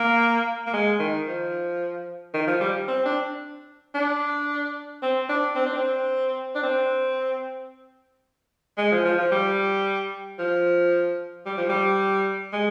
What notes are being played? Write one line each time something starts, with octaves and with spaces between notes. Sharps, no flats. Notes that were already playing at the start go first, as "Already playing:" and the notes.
Already playing: A#3
A#3
G#3
D#3
F3
D#3
F3
G3
C4
D4
D4
C4
D4
C4
D4
C4
D4
C4
G#3
F3
F3
F3
G3
F3
G3
F3
G3
G#3